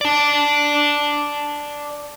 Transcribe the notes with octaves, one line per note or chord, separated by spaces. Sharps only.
D5 A5